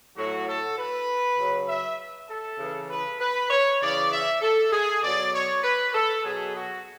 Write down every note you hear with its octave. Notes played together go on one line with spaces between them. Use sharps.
A2 F#3 F#4
A4
B4
C#3 F#3
E5
A4
C#3 E3
B4
B4
C#5
C#3 E3 D5
E5
A4
G#4
B2 F#3 D5
C#5
B4
A4
B2 F#3 G#4
F#4